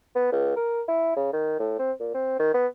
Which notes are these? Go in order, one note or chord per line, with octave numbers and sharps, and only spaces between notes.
B3
C#2
A#4
E4
C#3
D#3
A2
C4
A#2
C4
D#3
B3